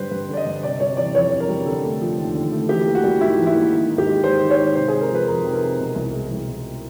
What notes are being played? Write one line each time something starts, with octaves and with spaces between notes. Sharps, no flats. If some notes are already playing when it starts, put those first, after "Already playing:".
Already playing: G2 D3 G3 B4 C5
G2 B4
D3 D5
D#5
G2
C3 D5
G3 C#5
E3 D5
F2 C#5
C3
A#4
G3
D3 A4
A3
F3
D#2
D3
A3
E3 G4
A#3
F#4
G3
G#2 E4
E3
E4
A#3
D#3
G#2
G4
G#3
G#2 C5
D#3
C#5
G#2
C3 C5
G#3 G#4
A#4
F3 B4
F2 A#4
C3
A#4
G#3
B2
C2
G#3
C2
B2